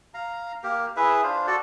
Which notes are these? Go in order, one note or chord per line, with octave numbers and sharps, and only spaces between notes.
F5 A#5
A#3 G4 A#4
E4 G#4 B4 E5
D4 F4 C5 F5
F#4 A4 D5